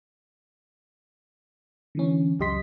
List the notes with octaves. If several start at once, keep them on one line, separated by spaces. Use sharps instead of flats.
D3 E3 C#4
C#2 F#2 G4 D#5 C6 B6